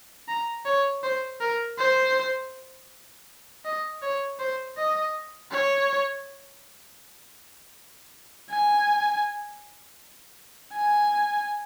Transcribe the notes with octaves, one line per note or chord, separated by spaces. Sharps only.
A#5
C#5
C5
A#4
C5
D#5
C#5
C5
D#5
C#5
G#5
G#5